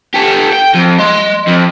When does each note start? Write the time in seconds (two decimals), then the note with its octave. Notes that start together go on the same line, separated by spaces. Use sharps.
0.14 G4 A4
0.53 G5
0.75 F2
0.99 D#5 C6
1.48 F2